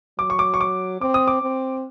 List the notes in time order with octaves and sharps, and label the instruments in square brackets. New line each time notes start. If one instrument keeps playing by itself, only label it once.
[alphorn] F#3 [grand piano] D6
[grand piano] C#6
D6
C#6
D6
[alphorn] C4 [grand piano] D6
[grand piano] D#6
D6
[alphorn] C4